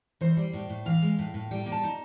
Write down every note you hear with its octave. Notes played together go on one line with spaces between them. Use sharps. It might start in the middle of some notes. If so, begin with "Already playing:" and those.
E3 C5
G3
A2
A2
E3 F5
G#3
A2
A2
G3 G5
A#3
A5
D#4